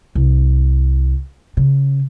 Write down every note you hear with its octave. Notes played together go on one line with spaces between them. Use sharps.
C2
C#3